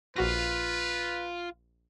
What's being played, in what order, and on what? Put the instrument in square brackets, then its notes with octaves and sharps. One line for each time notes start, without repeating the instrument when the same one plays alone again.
[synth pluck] A#1 F#4 A#6 [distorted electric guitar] F4 [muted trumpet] B4